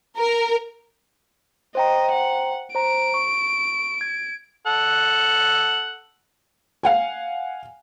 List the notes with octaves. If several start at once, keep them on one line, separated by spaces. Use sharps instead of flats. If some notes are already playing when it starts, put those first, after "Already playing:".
A#4
C5 D#5 G5 A#5
F#5
C5 A#5 D7
C#6
G#6
A4 F#5
F5 F#5 G#5